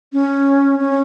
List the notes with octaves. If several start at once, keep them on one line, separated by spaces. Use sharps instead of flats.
C#4
C#4